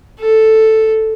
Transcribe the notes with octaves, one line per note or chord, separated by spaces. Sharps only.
A4